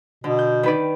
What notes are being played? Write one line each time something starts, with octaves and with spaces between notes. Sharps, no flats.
B2 D3
G6
D#3 B4 D5